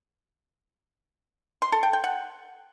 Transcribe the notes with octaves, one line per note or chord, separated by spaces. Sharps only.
C6
A4
G5
G5
F#5